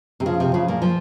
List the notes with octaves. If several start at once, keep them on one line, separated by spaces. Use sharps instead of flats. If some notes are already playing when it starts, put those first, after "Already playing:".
C3
C#3 F3
C3
C#3 F3
A#2
F3